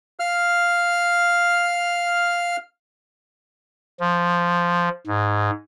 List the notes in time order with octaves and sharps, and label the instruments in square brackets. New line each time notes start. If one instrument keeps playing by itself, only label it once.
[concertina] F5 F6
[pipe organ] F3
G#2